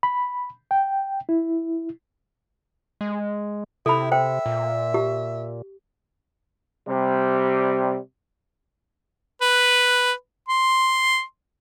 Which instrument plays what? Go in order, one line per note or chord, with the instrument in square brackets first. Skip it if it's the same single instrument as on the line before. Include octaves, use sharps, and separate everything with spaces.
[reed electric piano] B5
G5
E4
[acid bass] G#3
[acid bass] C3 [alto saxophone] E4 [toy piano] A4 B5
[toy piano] C5 G5 [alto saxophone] E5
[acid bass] A#2
[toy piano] G4
[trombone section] C3 G3
[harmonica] B4
C6